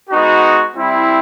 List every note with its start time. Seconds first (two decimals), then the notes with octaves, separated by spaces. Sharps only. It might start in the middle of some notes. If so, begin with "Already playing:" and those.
0.10 G#3 B3 D#4 F#4
0.77 G3 C4 E4